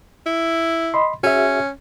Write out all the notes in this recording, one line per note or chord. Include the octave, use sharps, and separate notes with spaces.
E4
D#5 B5 C6
C#4 F#4 G#4 E5